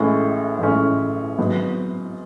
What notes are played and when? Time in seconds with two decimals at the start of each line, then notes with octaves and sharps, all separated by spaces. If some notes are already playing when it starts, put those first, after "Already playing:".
Already playing: A1 A2 G#3 C#4
0.59 A1 A2 G#3 C#4
1.38 G#1 G#2 F#3 B3